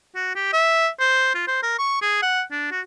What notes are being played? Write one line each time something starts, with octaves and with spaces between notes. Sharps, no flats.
F#4
G4
E5
C5
F4
C5
A#4
C#6
G#4
F#5
D4
F#4